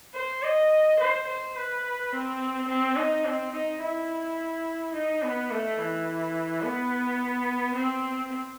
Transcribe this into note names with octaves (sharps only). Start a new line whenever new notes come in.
C5
D#5
C5
C5
B4
C4
C4
D#4
C4
D#4
E4
D#4
B3
A3
E3
B3
C4